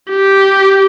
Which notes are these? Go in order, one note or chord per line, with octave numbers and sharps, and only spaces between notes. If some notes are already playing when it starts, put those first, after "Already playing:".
G4